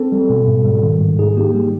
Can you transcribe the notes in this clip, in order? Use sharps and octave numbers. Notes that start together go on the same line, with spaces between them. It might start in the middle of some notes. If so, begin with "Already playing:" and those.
Already playing: C4 A4
G3
B2
G#2
G3
D#3
G#2
D#4 G#4
A#3 G4
G3 G4